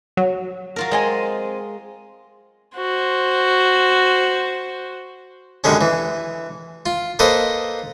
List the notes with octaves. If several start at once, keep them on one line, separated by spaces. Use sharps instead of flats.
F#3
F#3 F4 A#4
G#3 C4 D#5 G#5
F#4 C5
F#2 D3 G3 G#3 C#4
E3
F4
A#3 A4 B4 C5 D#5